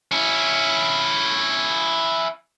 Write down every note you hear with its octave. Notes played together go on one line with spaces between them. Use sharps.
C#4 E4